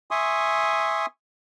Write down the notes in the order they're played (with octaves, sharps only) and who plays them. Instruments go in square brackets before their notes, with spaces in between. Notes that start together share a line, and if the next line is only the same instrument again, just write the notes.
[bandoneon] E5 G#5 C6 C#6 D#6